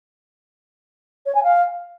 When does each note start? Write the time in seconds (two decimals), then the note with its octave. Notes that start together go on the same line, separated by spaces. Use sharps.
1.26 C#5
1.35 G#5
1.43 F5